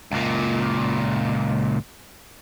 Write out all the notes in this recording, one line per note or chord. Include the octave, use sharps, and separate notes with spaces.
C#2 A#2